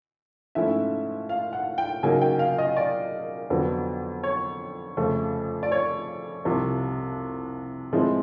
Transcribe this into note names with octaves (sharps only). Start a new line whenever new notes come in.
G#2 F3 A3 C#4 E4 E5
F5
F#5
G5
C#3 F#3 A#3 D#4 G#5
G5
F5
D#5
D5
F2 D3 F#3 B3
C#5
F2 C#3 F3 A3
D5
C#5
C2 C3 F3
A2 F3 G#3 C4 E4